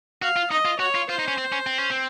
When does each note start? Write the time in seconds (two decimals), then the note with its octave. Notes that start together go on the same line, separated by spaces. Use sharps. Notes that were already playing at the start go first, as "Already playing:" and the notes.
0.22 F#4 F5
0.36 F4
0.51 D#4 D#5
0.65 F4
0.79 F#4 C#5
0.95 F4
1.09 F4 C5
1.19 D#4
1.28 C#4
1.38 C4
1.52 C#4
1.67 C4
1.78 C#4
1.91 C4